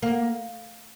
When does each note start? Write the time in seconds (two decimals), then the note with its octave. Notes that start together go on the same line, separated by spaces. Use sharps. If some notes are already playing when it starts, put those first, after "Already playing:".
0.02 A#3